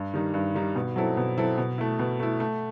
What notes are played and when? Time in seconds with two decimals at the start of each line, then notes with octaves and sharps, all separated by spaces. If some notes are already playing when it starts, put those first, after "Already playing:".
Already playing: G2
0.14 D#3 G3 D#4
0.34 G2
0.54 D#3 G3 D#4
0.75 B2
0.96 F#3 C4 E4 A4
1.17 B2
1.38 F#3 C4 E4 A4
1.58 B2
1.78 A3 E4
1.99 B2
2.20 A3 E4
2.40 A3